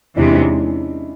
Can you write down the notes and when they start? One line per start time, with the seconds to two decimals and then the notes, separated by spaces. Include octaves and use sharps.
0.17 E2 C3 E3 G#3 D4 E4
0.31 C#4 D#4